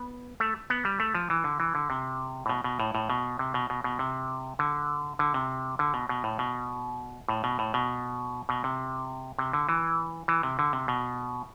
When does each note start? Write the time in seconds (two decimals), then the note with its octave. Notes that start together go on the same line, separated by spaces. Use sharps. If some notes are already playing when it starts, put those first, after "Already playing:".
Already playing: B3
0.40 A3
0.70 B3
0.85 G3
1.00 A3
1.15 F3
1.30 E3
1.44 D3
1.60 E3
1.75 D3
1.90 C3
2.46 A2
2.49 B2
2.64 B2
2.80 A2
2.95 A2
3.10 B2
3.39 C3
3.54 B2
3.70 B2
3.84 B2
3.99 C3
4.59 D3
5.19 D3
5.34 C3
5.79 D3
5.94 B2
6.09 B2
6.24 A2
6.39 B2
7.29 A2
7.44 B2
7.59 A2
7.74 B2
8.49 B2
8.64 C3
9.39 C3
9.53 D3
9.69 E3
10.28 E3
10.43 C3
10.59 D3
10.73 C3
10.88 B2